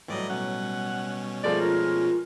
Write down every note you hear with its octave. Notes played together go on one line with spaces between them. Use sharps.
A2 E3 F#3 G3 D5 D#5
B2 C#4 F#5
F3 G#3 A3 D5
F4 A#4